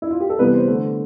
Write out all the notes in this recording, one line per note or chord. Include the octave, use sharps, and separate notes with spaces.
E4
F4
G4
A4
C3 E3 G3 B3 B4
C5
D3 A3